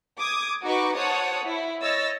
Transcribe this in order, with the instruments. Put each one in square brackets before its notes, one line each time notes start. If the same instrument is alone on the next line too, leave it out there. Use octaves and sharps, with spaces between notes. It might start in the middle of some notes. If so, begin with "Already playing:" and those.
[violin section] D6 D#6 G#6
D#4 F#4 B4 C#6 D6
C5 C#5 F#5 A5 D#6
E4
C#5 D#5 E6 A6 A#6